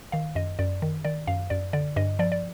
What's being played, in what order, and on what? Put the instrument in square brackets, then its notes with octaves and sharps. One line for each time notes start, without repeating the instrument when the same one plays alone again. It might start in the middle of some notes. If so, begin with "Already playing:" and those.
[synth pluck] D#3 F5
F#2 D#5
F#2 D5
D#3
D#3 D5
F#2 F5
F#2 D5
D3 D5
G2 D#5
F3 D5
D5